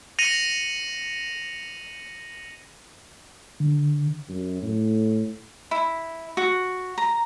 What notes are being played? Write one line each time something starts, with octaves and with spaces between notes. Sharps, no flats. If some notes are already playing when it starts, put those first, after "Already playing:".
A#6 C#7 D#7 F7 F#7
D3
F#2
A2
E4
F#4
A#5